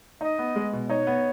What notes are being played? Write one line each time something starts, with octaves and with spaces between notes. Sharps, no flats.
D#4 D#5
B3
G#3
B2
D#4 C#5
B3